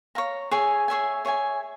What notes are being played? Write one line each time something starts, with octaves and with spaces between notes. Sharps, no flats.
C#5 F5 A#5
G#4 C#5 E5 G#5
G#4 C#5 E5 G#5
G#4 C#5 E5 G#5